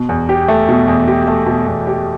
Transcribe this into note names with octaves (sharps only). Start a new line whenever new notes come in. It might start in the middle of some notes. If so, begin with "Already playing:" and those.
Already playing: B2
E2
G4
A3
B2
E2
G4
A3
B2
E2
G4